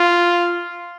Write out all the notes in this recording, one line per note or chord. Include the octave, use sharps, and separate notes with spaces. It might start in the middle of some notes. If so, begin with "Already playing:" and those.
Already playing: F4